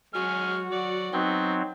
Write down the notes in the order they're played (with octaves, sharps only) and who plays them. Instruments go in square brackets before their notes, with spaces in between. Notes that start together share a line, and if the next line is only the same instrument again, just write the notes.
[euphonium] F#3 [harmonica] G#3 G#5 F6 [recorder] F#4
[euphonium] F#3 [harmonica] D5 F#5
[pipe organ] F#3 C4 [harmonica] B3 [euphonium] D#4